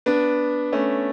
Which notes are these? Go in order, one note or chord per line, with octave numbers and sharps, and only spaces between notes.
B3 D4
A3 C#4